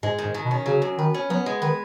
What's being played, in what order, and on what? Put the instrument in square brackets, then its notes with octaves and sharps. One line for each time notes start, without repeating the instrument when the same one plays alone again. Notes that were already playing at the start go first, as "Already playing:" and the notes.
[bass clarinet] G#2 [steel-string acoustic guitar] G#3
[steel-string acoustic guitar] D#3
[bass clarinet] G#2
[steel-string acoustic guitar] D#3
[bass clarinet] B2
[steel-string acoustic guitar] C#4
[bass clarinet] C#3 [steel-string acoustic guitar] F#3
[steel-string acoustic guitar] F#2
[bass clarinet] D#3 [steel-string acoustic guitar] B4
[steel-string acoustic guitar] C#4
[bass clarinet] F#3 [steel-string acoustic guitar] B3
[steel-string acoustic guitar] G#3
[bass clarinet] D#3 [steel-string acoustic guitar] B4